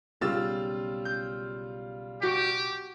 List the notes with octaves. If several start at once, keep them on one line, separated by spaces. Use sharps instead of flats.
B1 C#3 G3 F4 E6 A6
G6
F#4 G4 D7